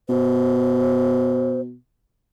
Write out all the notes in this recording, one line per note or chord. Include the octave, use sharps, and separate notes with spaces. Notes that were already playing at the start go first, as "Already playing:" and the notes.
B2 C5